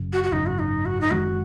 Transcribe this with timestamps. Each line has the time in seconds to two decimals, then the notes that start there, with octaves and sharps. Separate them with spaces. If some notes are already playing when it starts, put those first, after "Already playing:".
Already playing: F#1 F#2 C#3
0.13 F#4
0.24 F#4
0.32 G#1 F#2 C#3 D#4
0.46 F#4
0.59 D#4
0.85 F#4
1.01 D#4
1.11 F#1 F#2 D#3 G#3 F#4